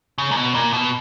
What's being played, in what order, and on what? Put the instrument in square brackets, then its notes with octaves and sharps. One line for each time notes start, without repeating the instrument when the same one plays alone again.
[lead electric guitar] C#3
A#2
B2
A#2
B2